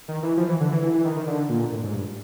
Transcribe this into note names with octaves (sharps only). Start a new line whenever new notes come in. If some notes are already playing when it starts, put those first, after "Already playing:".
D#3
E3
F3
E3
D3
E3
E3
E3
D#3
D#3
D3
A#2
A2
G#2
G2